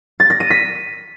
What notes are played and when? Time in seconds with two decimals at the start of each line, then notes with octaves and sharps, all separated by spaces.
0.20 A6
0.30 A#6
0.40 D#7
0.50 B6